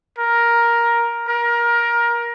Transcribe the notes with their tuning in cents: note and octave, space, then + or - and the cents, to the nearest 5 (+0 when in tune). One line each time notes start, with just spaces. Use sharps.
A#4 +10
A#4 +20